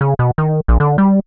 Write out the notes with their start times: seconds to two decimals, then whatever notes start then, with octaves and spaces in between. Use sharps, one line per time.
0.01 C#3
0.19 B2
0.38 D#3
0.68 A#1
0.80 D3
0.98 G3